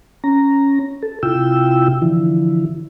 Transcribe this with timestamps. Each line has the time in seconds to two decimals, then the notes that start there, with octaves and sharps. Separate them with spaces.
0.24 C#4 A#5
1.03 A4
1.23 C3 E4 F4 G5 E6
2.02 D3 E3 F3 E4